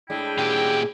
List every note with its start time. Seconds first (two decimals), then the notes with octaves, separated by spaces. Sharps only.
0.10 A2 G#3 D4 E4 G5
0.38 A#2 G4